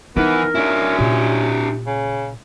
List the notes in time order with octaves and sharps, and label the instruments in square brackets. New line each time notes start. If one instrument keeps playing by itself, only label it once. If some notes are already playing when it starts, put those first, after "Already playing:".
[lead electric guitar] E3 [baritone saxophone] B3 [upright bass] D#4 [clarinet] A#4
[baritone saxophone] C#4 [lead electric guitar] D4 E4
[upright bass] A#2 [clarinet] G4
[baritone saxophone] C#3